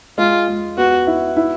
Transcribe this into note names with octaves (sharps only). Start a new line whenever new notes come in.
G#3 F4
G#3
B3 F#4
E4
E4